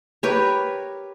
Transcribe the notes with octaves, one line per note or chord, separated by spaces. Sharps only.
G4 A#4 B4 C#5